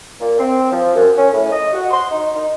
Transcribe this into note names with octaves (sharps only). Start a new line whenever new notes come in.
A#2
C4
F3
F#2
C#4
A2
D#5
F#4
C6
D#4
D#4